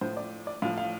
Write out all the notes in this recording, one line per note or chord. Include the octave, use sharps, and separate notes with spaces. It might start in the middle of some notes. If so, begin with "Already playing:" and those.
A2 F3 C5
D5
D5
A2 F3 F5
F5